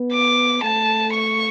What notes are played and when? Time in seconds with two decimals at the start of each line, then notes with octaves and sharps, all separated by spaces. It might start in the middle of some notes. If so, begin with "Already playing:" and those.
Already playing: B3
0.13 D6
0.63 A3 A5
1.14 C#6